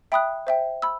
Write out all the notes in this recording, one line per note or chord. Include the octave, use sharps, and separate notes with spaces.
E5 G5 B5 D#6 F#6
C5 E5 G5
B5 E6